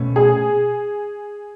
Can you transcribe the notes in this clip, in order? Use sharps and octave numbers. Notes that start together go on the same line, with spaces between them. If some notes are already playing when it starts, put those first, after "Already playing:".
Already playing: B2 A3 C#4
G#4